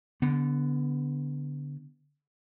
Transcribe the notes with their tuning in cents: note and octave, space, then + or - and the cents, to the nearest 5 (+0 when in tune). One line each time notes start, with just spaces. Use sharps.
D3 -20 B3 +0